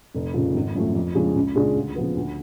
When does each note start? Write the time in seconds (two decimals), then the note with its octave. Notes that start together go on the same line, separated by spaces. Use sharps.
0.14 F1
0.34 F2 C#3 F3
0.55 G#1
0.75 F#2 F3 A3
0.95 F2
1.15 C#3 F3 G#3 D4
1.35 C#2
1.56 C#3 G#3 D4 F4
1.76 D2
1.96 C#3 F3 B3
2.16 D2